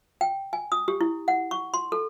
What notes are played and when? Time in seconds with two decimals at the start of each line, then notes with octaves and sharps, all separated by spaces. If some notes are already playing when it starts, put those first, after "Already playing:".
0.21 G5
0.53 G#5
0.72 D#6
0.88 G4
1.01 E4
1.28 F#5
1.51 C#6
1.74 C6
1.92 A4